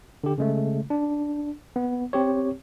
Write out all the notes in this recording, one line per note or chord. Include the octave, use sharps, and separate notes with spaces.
D3 G4
C#3 G#3 A3
D4
B3
C4 G4 C#5